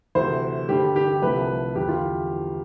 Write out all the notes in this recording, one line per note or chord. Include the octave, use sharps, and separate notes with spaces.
D2 C3 E3 C5
G2 D3 G3 G4
G4
C2 C3 F3 A3 B4
E2 D3 G3 G4
F4